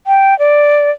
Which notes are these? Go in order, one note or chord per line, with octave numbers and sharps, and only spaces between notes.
G5
D5